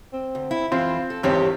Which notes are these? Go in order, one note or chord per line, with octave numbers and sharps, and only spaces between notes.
C4
D2
E4
F2 E3 C4 F4
A4
G#1 E2 G2 C4 C#4 G4 C#5